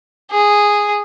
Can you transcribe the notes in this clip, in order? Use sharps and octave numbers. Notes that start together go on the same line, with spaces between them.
G#4